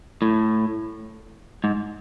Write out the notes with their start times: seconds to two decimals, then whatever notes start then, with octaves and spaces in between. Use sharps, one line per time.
0.22 A2
1.64 G#2